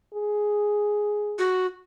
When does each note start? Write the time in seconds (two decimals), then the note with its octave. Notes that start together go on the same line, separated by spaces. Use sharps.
0.14 G#4
1.39 F#4